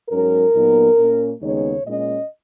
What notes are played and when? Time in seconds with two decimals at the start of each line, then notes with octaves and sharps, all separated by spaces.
0.10 G#2 F#3 C#4 A#4
0.54 A#2 F#3 B3 D#4
0.98 A#2 A#3 C#4
1.40 D#2 C#3 G#3 B3 D#4 C#5
1.84 A#2 G#3 C#4 D#5